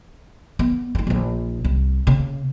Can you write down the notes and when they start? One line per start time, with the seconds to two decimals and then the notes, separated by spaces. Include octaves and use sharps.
0.59 B3
0.95 C#4 D#4
1.07 A#1 D#4
1.65 C2
2.07 C#3 A#3